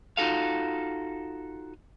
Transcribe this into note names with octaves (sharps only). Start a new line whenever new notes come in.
D#4 F4 F#4 A4 F5